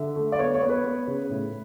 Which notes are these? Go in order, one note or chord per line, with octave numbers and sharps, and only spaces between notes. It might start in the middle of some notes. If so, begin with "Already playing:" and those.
Already playing: D3 E5
A3
D5
B3 C#5
C#5
B3
B4
B3
C#3
A2